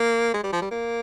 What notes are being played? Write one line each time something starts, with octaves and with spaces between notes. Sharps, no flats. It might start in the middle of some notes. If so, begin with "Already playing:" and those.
Already playing: A#3
G#3
G3
F3
G3
A#3